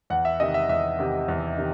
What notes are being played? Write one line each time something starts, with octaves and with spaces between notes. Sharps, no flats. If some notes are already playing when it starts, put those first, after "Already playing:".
E2 F#5
E5
C3 D#3 D#5
E5
E2 E5
C3 D#3
E2
C3 D#3